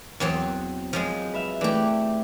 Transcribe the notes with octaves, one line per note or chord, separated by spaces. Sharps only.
E2 F#3 C4
F3 F#3 G#3
B4 E5 F6
E3 A3 E4 G4 D5